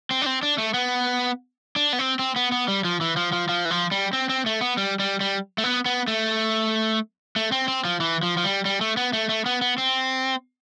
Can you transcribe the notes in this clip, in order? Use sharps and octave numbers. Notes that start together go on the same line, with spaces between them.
C4
D4
C4
D4
A3
B3
D4
B3
C4
C4
B3
B3
G3
F3
E3
F3
F3
F3
E3
F3
G3
C4
C4
A3
B3
G3
G3
G3
A3
B3
B3
A3
A3
C4
C4
F3
E3
F3
F3
G3
G3
A3
B3
A3
A3
B3
B3
C4